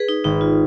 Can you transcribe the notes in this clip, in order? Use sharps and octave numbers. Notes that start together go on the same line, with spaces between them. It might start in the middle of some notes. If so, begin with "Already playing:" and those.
Already playing: G#4 B4
D#4
G#1 D#4
F4